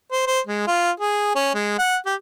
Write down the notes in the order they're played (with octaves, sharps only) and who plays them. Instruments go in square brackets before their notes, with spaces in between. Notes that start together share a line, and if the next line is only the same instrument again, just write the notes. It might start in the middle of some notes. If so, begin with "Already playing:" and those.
[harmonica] C5
C5
G#3
F4
G#4
C#4
G#3
F#5
G4